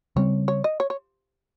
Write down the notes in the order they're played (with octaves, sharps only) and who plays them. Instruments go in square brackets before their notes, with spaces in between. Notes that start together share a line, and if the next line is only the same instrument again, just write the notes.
[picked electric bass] C#3 G3 C4 [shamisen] C#5
[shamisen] C#5
D#5
C#5
C#5